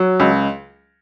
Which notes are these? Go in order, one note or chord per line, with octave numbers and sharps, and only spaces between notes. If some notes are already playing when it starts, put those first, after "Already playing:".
Already playing: F#3
C#2